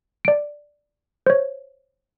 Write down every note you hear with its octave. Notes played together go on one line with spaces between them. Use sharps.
D5 D7
C5 C#5